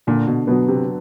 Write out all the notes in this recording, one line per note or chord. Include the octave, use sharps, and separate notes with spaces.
A#2 D3
B2
B2 F#3 B3
C3